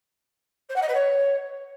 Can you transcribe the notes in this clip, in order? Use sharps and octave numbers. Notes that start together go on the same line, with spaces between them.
C5
F#5
D#5
B4
C#5